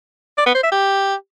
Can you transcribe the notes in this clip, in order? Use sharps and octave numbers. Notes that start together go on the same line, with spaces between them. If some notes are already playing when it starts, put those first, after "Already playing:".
D5
B3
C5
E5
G4